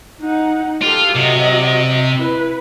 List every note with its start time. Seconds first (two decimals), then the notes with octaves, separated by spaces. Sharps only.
0.21 D#4 F#5
0.82 F4 G4 A4
1.15 C3 F#3 D#5
2.18 E4 B4